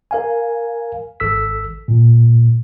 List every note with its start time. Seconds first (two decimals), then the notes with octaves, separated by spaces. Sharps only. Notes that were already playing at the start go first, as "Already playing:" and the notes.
0.11 A#4 F5 G#5
1.20 G#1 A4 E6 B6
1.88 A#2